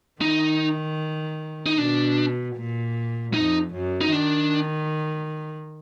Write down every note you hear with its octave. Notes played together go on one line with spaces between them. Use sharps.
D#3 D#4
D#4
B2 D4
A#2
F2 D#4
F#2
D#4
D#3 D4